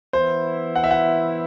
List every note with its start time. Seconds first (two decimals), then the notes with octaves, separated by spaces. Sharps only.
0.13 E3 B3 E4 C5
0.75 F#5
0.84 E5
0.91 F#5